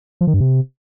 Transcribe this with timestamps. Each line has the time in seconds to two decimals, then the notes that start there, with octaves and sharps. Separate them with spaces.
0.21 F3
0.27 D#3
0.34 G2
0.40 C3